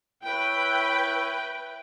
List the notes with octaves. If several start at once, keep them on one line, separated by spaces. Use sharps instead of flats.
E4 B4 C#5 G5